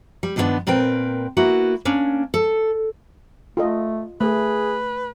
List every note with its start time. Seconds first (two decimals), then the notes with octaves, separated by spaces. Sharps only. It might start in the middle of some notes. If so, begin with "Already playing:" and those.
0.23 G3
0.36 G2 D#3 F3 G3 B3 D4
0.67 A#2 C4 A#4 B4 G5
1.37 A#3 B3 E4 F#4
1.85 A#3 C#4 D4
2.34 A4
3.57 A3 F4 A4 D#5
4.21 A3 G#4 B4